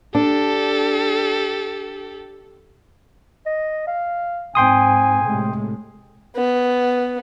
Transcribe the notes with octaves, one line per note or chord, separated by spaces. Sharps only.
D4 G4 A4
D#5
F5
G#2 C4 G5 G#5 C6 D#6
A2 C3 G#3
B3